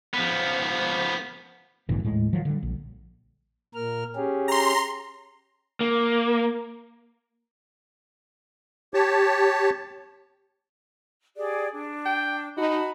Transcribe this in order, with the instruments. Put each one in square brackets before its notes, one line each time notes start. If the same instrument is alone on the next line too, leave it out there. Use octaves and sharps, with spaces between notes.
[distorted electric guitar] F3 B3
[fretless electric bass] A#1 G#2 D3 E3
D#1 A2 G#3
D#3 F3 F#3
D3 G3
A#1
[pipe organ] A#2 A#4 F6
C#4 G4 G#4
[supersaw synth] A#5 C6
[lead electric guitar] A#3
[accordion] G4 C#5 A5
[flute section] G4 G#4 D5
D4
[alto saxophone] G5
[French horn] D#4 [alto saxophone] F#4 [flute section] A5 B5